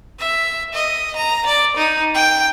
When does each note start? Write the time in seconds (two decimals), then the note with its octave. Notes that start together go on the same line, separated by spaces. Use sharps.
0.20 E5
0.74 D#5
1.16 A#5
1.46 D5
1.77 D#4
2.14 G5